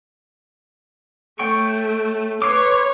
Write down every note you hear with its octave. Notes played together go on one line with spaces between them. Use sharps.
A3 C#5 G5 C#6
B4 C#5 C6 D6